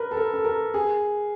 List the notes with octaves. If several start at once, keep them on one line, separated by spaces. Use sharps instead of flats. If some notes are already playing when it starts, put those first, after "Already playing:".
Already playing: A#4 B4
A4
A#4
A4
A#4
G#4